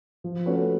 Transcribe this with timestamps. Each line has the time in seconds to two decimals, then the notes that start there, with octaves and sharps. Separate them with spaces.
0.24 F3
0.46 A3 C#4 F#4 B4